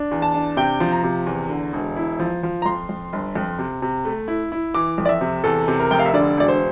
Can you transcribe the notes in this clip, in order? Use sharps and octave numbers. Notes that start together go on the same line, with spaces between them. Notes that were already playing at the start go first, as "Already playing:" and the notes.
Already playing: D4
E2
A5
D4
C3 G5
F3
A#5
C3
E2
D3
E1
E4
F3
F3
A#5
F2 C6
F2
G1
F2
C3
C3
A3
E4
E4
E3 D6
F2
D5
E5
C3
E2 A4
C3
A#4
F1 G5
F5
E5
D3 D5
E1 D5
C5